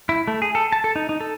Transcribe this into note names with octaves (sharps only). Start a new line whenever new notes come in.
E4
A3
G#4
A4
A5
A4
D#4
D#4
A4